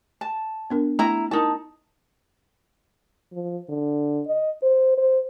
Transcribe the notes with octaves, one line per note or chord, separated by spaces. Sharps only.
A5
B3 D4 A#4
A3 E4 A#5
D#4 E4 A#4 A5
F3
D3
D#5
C5
C5